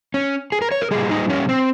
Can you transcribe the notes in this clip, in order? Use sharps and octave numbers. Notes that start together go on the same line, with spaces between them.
C#4
G#4
A#4
C#5
A#4
A#2 G3 G#4
D#4
C#4
C4